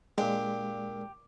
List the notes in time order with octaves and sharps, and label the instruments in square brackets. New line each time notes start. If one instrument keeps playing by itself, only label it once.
[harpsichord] A#2 A#3 D4 [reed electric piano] G#3 [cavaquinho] G4